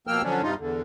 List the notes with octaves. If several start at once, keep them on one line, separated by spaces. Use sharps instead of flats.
B2 F3 A#3 G5 E6 F6
D3 F3 F#3 C#4 D4
G2 C3 G3 D#4 F4
E2 D3